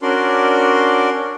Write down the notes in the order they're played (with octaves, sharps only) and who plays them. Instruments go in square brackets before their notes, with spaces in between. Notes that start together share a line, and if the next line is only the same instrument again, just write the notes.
[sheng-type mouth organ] C#4 D4 F#4 A#4 D5 C6